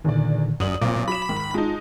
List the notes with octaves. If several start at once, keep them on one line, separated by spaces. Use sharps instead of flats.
E2 A#2 D3 D#3 D5
G1 F#2 D5 D#6 F#7
B1 A#2 C4 D6
F#3 B5 E7
G#2 D#3
G#3 D#4 F4 A5